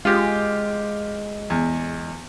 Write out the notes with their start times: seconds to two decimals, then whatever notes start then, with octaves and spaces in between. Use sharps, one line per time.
0.05 G#3 F4 G4
1.50 E2